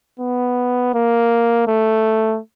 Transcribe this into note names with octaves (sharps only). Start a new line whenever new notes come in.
B3
A#3
A3